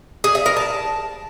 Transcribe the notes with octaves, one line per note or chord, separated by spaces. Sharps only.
G#4
E5
A#4
A5